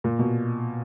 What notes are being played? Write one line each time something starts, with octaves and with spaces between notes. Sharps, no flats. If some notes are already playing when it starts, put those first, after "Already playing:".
A#2
B2